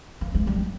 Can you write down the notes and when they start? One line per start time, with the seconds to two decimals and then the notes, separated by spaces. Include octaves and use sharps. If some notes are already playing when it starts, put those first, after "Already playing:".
0.21 A#3
0.35 G#3
0.47 G3